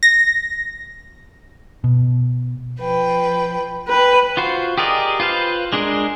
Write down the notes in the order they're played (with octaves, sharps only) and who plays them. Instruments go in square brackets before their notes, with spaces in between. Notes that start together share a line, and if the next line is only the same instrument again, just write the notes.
[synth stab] A#6
[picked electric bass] B2
[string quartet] F3 B4 G5
[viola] B4 [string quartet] G5
[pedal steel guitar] F4 F#4 C5
G4 G#4 A#4 D5 D#5
F4 B4 C5 F5
G#3 D4 G#4 A#4